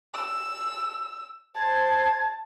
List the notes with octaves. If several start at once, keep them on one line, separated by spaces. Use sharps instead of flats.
E6
C5 A5 G#6